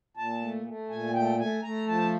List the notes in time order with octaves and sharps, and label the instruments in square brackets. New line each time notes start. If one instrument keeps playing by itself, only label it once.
[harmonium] A#2 A5
A3
A3
A#2 G#5
A3 G5
A3 G#5
A3 A#5
F3 A5